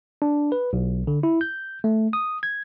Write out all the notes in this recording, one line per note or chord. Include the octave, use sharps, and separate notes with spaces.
D4
B4
B1
D3
E4
G6
A3
D#6
G#6